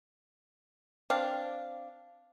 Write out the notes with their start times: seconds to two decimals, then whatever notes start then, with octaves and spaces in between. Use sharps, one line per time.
1.10 C4 D4 F5